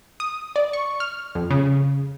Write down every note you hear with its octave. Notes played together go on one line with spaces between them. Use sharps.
D#6
D5
C#6
F6
F2
C#3